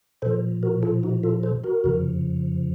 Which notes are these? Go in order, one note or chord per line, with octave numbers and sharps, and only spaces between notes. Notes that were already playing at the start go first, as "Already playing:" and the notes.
A#2 F3 A4 C5
F#4 A#4
F4 A4
D#4 F#4
F4 A4
A4 C5
F#4 A#4
F2 C#3 F3